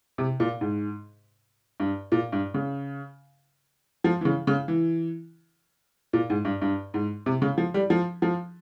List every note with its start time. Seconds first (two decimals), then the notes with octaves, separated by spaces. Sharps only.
0.18 C3
0.40 A#2
0.61 G#2
1.80 G2
2.12 A#2
2.32 G2
2.54 C#3
4.04 F3
4.21 E3
4.25 C#3
4.47 C#3
4.68 E3
6.13 A#2
6.30 G#2
6.45 G2
6.62 G2
6.94 G#2
7.26 C3
7.42 C#3
7.58 F3
7.74 G3
7.90 F3
8.22 F3